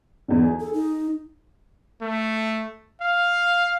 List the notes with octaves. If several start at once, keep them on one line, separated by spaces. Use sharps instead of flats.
B1 E2
G#4
A4
D#4
A3
F5